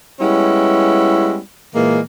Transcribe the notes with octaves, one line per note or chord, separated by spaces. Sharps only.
G3 G#3 B3 C#4 E4
A#2 E3 G#3 A#3